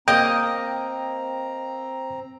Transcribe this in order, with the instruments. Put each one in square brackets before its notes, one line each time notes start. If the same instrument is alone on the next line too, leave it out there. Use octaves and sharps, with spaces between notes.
[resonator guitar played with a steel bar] A#3 [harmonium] C4 A#5 [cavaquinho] D#5 [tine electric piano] G5